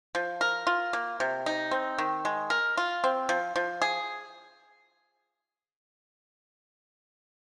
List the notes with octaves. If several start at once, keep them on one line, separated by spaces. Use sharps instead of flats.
F3
A#4
F4
A#3
C3
D#4
C4
D#3
G#3
A#4
F4
C4
F3
F3
G#4